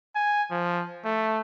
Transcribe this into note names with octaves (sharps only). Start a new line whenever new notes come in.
G#5
F3
A3